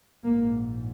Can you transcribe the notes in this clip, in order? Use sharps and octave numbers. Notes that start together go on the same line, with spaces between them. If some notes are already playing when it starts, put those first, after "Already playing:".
A#1 G#2 A#3